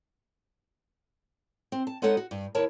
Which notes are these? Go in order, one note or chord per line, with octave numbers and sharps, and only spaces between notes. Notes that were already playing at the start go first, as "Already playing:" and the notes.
C4
A5
G#3 B3 D#4 A4 C#5 F#5
F#4
G2
D#2 E4 A#4 C#5 A5